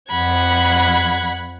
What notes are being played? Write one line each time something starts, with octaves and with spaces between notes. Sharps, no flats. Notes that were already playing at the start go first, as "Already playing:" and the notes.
F2 F#5 B5 G#6